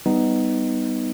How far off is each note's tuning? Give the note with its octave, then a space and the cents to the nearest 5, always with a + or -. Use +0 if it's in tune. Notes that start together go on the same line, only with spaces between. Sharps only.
G3 +0 B3 +20 D#4 +0